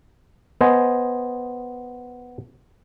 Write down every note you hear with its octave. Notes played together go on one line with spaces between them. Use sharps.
B3 C5 D#5 G#5